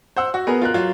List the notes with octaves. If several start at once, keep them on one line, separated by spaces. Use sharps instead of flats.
C5 F#5 E6
F#4
B3 G#4 A#4 B4
F4 A#4 F#6
F#3 F4